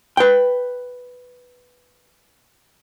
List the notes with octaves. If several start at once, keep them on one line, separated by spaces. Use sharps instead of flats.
B4 G5